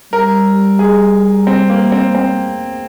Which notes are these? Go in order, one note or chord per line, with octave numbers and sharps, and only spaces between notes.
G3 A#4
G#4
C4
A#3
C4
C4